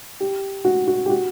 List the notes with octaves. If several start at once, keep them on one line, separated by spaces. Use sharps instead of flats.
G4
F#4
F#4
G4
F#4